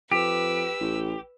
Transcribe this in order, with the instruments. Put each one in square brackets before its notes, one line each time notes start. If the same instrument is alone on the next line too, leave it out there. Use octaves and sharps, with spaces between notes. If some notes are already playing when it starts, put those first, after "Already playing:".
[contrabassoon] F2 [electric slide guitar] G4 [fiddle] B4 E6
[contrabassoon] A1